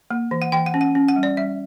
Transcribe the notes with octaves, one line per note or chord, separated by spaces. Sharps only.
A#3
E3
F#5
E3 G5
F#5
C#4
F#5
C#4
F#5
G3
D5
G3 E5